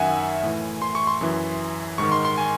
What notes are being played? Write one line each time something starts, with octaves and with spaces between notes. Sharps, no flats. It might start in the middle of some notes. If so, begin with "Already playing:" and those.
Already playing: F#2 D#3 E5 F#5 G#5
A2 E3
C6
C#6
C6
F#2 E3
G#2 D#3 C#6
C6
C6
G#5